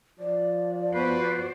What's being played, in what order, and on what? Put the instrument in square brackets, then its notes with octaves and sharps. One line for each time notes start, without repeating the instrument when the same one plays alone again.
[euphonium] F3 [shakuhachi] D5
[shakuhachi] B3 [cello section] F#4 C5 D5 [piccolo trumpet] B4